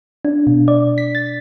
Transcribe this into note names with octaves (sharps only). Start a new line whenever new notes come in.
D4
B2
D5
B6
A6